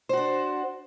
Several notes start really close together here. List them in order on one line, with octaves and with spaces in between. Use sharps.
C5 F#4 D4